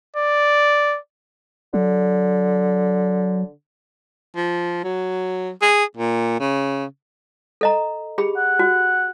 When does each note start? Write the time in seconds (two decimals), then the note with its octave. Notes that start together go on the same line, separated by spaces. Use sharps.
0.16 D5
1.74 D3 F#3
4.36 F3
4.84 F#3
5.62 G#4
5.97 A#2
6.40 C#3
7.61 A4 D#5 A#5
8.18 G4 G#4 B5
8.37 F#5
8.59 F#4